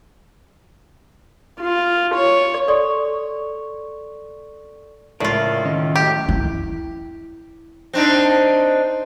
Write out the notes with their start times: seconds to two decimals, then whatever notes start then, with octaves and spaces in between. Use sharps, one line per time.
1.60 F4
2.15 C#5
2.68 A4 D5 C6 C#6
5.20 C#2 A2 F4 A#4 D5
5.65 D#3 C#4 D#5
5.96 F#3 A3 G4
6.29 E4
7.93 C4 D4 D#4